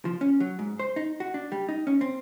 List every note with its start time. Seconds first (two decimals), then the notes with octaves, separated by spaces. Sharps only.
0.05 F3
0.21 C#4
0.40 F#3
0.59 G#2
0.79 C5
0.96 D#4
1.20 F#4
1.34 D4
1.52 G3
1.69 D#4
1.87 C#4
2.01 C4